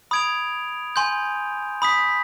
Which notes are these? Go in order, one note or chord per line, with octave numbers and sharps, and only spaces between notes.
B5 D#6 G#6 D7 F7
G#5 C6 G6
B5 D#6 B6